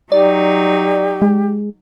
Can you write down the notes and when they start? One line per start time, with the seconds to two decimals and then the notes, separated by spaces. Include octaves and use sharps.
0.12 F#3 D#4 G4 D5
1.22 G#3